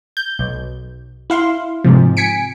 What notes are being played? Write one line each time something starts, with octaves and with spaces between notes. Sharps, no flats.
G6
B1
E4 F5 C6
G#2 C3 F3
G#5 B6 C#7 D7